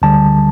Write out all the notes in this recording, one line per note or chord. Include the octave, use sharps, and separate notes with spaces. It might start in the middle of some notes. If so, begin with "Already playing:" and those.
D2 D3 G3 A5